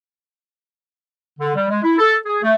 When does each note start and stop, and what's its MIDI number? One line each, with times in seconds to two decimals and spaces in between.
1.40 1.54 50
1.56 1.67 55
1.69 1.80 56
1.82 1.98 64
1.98 2.15 69
2.26 2.39 68
2.43 2.55 57